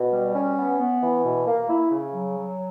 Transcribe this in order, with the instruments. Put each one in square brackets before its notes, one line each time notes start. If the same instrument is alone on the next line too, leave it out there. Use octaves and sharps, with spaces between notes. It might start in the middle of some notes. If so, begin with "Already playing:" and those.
Already playing: [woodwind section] B2
G3
C#4
B3
B3
E3
B2
A#3
E4
C#3
F#3
F#3